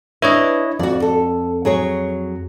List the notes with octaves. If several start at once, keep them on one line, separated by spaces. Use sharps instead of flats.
D4 E4 B4 C#5 D#5
F2 F#4 D5
A4
F#3 G#4 C#5